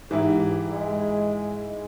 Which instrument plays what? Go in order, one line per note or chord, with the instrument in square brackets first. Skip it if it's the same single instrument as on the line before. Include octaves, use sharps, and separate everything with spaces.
[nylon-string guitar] G#2 [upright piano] E3 E4 [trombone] G4
[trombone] G#3